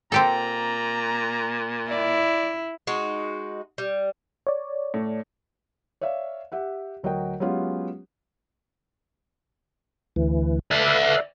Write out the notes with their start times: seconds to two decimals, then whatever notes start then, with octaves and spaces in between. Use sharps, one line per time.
0.12 A#2 C4 G4 A4 A#5
1.90 E4 D5
2.87 G#3 D#4 F#4
3.78 G3
4.47 C#5 D5
4.94 A2
6.01 C#5 D5 E5 F5
6.52 G4 E5 F#5
7.03 D2 F#3 F#4 A#4 D#5 G5
7.40 F#3 G#3 B3 C#4 F4 G4
10.16 D2 E3
10.71 A4 B4 D5 E5 F5